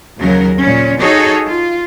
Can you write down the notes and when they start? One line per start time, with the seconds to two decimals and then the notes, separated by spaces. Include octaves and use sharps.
0.19 D#2 C#3 F#3 A#4
0.61 A#2 C#4
1.00 D#4 F#4 G#4 A4 C#5 D#5
1.49 F4